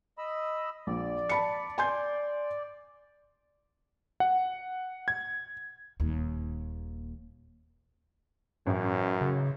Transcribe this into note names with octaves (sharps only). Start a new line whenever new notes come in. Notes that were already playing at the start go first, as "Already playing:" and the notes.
D#5 B5 E6
A#1 D5
A5 B5 C#7
G#5 C6 G6
F#5
G#6
D#1 D#2
A1 F#2
C#3